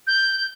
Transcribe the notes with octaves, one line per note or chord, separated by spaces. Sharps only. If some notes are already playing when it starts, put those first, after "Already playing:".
G6